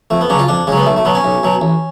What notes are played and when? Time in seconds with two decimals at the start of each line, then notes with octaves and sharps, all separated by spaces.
0.10 F2 A3
0.21 B3
0.30 C#3 F#3 D4
0.39 F4
0.48 F2 D4
0.67 C#3 F#3 G#3
0.77 B3
0.86 B1 A3
0.96 A3
1.05 B2 F#3 B3
1.15 C#4
1.24 B1
1.43 B2 F#3
1.61 A1